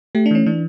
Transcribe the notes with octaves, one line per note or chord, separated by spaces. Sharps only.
A3 G4
D4
E3 C#4
E3 D4